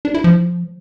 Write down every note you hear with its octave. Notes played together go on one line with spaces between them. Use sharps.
D4
E4
F3